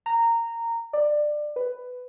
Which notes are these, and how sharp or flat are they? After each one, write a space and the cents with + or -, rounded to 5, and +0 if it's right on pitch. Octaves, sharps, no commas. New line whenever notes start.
A#5 -15
D5 +20
B4 +10